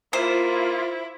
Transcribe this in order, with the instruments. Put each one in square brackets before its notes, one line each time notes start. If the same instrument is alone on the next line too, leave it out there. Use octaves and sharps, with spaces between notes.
[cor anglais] A#3 [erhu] E4 [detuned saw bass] F4 [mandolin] C5